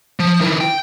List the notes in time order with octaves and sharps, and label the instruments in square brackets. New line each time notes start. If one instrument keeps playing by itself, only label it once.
[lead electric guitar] F3
D#3 E4
G5